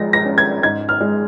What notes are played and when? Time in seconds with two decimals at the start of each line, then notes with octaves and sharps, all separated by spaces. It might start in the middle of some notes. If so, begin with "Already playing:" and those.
Already playing: F3 G#3 A#6
0.13 A#6
0.26 C#4
0.38 G#6
0.63 G#2 G#6
0.89 F6
1.01 G#3